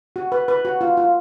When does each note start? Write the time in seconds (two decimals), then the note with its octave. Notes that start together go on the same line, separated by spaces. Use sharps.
0.16 F#4
0.32 B4
0.48 B4
0.65 F#4
0.81 F4
0.97 F4